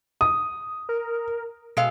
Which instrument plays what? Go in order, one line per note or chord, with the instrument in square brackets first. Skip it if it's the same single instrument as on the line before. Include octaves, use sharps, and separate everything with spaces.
[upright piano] D#6
[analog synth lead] A#4
[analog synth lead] B2 [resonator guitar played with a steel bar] G#3 A4 F5